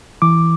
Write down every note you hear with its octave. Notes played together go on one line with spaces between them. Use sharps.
E3 D6